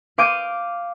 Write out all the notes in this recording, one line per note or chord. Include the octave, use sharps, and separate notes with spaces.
F5 D6 G6 D7 D#7